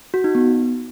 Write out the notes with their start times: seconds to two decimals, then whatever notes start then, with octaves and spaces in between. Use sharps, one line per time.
0.14 F#4
0.24 D#4
0.35 B3